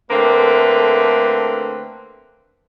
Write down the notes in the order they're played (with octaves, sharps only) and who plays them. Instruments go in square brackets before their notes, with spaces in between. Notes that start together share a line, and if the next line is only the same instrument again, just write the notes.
[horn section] D3 A3 A#3 C4 B4